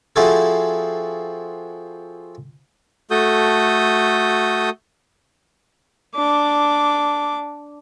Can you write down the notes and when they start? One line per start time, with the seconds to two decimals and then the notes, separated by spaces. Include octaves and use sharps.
0.16 F3 C4 E4 F#4 G#4 A4
3.11 A3 F#4 A4 D#6 G6
6.15 D4 D6